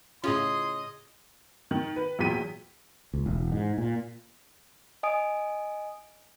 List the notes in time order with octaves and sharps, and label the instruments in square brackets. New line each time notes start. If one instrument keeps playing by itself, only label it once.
[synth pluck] A2 C#3 F4 [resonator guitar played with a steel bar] C#4 G#4 [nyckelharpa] D#5 [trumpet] C6
[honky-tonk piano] D#3
B4
E2 A#2 F#3 G5 B6 D#7
[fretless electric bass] C#2
E1
G#2
A#2
[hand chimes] D#5 G#5 D#6 D7